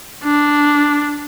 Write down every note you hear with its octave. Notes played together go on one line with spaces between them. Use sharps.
D4